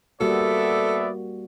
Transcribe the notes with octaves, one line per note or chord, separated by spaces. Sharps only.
G3 A#3 B3 F#4 A4 D5 E5